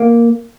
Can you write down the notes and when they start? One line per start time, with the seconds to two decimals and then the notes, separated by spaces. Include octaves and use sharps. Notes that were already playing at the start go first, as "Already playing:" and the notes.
Already playing: A#3